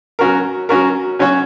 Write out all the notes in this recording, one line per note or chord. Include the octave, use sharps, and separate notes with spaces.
F#3 C#4 F#4 A#4
F#3 C#4 F#4 A#4
F#3 C#4 F#4 C#5